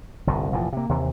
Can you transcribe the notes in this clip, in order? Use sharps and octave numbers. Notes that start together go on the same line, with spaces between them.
G1 C2 A2
F1 A#2 E3 F3
C3 A#3
D#2 C3 E3